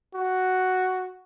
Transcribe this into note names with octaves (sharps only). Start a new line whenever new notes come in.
F#4